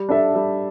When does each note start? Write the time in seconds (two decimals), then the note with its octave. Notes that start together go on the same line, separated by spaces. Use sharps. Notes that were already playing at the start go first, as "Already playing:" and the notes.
Already playing: G3
0.09 D4 A4 E5
0.35 G3